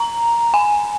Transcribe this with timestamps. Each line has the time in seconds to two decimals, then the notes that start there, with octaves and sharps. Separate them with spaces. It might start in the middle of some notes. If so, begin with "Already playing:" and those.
Already playing: A#5
0.54 G#5